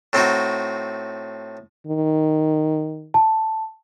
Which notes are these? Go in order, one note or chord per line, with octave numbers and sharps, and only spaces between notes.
A2 C4 D#4 F#4
D#3
A5